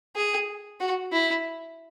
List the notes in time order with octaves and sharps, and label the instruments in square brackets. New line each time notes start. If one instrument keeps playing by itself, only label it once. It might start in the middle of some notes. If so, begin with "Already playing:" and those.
[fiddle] G#4
F#4
E4